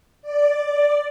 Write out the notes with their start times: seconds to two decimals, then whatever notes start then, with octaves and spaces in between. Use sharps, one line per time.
0.22 D5